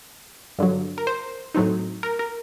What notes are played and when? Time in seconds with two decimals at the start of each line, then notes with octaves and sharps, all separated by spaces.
0.58 G2 D3 F#3
0.98 A#4
1.07 C5
1.55 A2 F#3 A3 C4 D#4
2.03 A#4
2.19 A#4